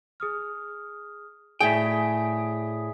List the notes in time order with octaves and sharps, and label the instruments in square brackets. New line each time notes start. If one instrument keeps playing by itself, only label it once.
[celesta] G#4 D#6 F6
[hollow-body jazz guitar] A2 G5 [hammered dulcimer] G#4 [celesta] D5 E5 B6